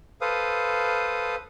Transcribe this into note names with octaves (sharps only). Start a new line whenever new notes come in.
A4 B4 C5 F5 D#6